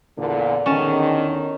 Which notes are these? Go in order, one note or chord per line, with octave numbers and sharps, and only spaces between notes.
E2 A#2 D3
E2 D3 D#3 C#4 A5